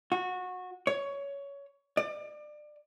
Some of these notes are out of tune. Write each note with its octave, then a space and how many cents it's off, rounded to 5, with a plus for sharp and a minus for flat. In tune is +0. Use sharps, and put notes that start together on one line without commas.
F#4 -20
C#5 +15
D5 +30